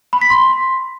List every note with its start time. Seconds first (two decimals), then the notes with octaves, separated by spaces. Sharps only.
0.13 B5
0.22 B6
0.30 C6